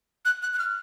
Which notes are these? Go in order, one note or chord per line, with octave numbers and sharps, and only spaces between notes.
F#6
F#6
F#6
F6